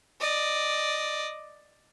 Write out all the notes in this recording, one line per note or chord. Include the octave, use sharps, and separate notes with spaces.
D5 D#5